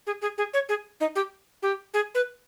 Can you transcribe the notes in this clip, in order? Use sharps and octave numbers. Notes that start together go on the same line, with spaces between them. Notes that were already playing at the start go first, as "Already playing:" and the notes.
G#4
G#4
G#4
C#5
G#4
D#4
G4
G4
G#4
B4